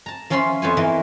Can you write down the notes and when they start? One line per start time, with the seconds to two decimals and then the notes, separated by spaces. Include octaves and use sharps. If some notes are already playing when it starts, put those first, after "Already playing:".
0.06 A5 A#5
0.30 F3 C#4 F4 E5 B5 C6
0.62 F2 B3 F4 C5 C#5 G#5
0.77 E3 A#3 A#4 D#5